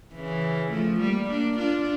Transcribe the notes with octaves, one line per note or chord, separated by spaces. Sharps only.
C#3 E3
F3 A3
G3 A#3
A#3 D4
D4 F4